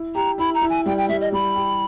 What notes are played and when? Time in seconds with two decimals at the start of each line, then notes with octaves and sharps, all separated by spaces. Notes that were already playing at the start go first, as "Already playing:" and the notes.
Already playing: E4
0.14 G4 A#5
0.38 E4 B5
0.54 A#5
0.62 E4
0.69 G#5
0.86 G3 G5
0.97 G5
1.08 G3 E5
1.20 D#5
1.32 G3 B5
1.55 G4